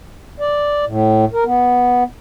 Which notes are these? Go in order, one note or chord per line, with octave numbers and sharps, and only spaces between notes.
D5
A2
A#4
B3